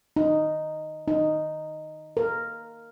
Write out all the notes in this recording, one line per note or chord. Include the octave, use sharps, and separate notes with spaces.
D#4
D#4
A#4